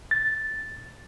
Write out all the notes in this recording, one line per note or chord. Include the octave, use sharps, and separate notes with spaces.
A6